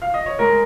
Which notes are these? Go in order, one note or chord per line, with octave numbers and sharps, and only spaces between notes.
F5
D#5
C#5
G#3 A#4